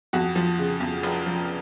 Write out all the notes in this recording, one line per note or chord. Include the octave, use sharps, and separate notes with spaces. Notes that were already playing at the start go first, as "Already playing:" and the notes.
F2 F#4
F3
C#3
F2
F1
F3